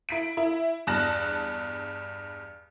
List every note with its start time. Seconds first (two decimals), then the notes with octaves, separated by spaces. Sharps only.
0.09 E4 B6 D7
0.37 E4
0.87 E2 G2 A5 F#6 A#6 E7